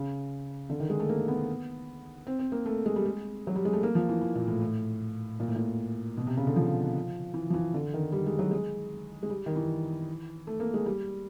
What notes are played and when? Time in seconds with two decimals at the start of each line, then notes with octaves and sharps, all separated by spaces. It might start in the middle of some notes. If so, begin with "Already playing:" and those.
Already playing: C#3
0.70 D3
0.80 D#3
0.90 G#3
1.00 A3
1.09 A#3
1.28 B3
2.27 C4
2.39 C4
2.52 A#3
2.66 A3
2.86 G#3
2.96 G3
3.05 G#3
3.47 F#3
3.56 G3
3.65 G#3
3.73 A3
3.83 A#3
3.95 F3
4.09 E3
4.21 E3
4.35 A#2
4.48 A2
4.61 A2
5.40 A#2
5.48 A2
5.56 A#2
6.17 B2
6.27 C3
6.37 C#3
6.47 D3
6.56 F3
7.34 E3
7.50 F3
7.54 E3
7.74 D3
7.94 D#3
8.12 G3
8.26 G#3
8.39 F#3
8.51 G#3
9.23 G#3
9.30 G3
9.46 D#3
9.56 E3
10.47 A3
10.60 A#3
10.74 G#3
10.86 G3